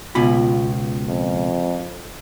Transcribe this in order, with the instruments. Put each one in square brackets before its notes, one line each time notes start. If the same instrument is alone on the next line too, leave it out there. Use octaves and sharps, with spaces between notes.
[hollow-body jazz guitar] C#2 B2 B5 [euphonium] F4
[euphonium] F2